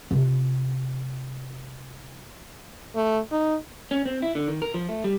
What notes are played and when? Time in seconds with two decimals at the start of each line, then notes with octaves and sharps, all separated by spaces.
0.11 C3 F4
2.95 A3
3.32 D#4
3.91 C#4
4.06 C4
4.22 E4
4.35 D3
4.48 D#3
4.62 A#4
4.74 F3
4.89 A3
5.04 G3